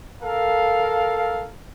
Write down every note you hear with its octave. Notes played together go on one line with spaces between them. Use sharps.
A4 A#4 F5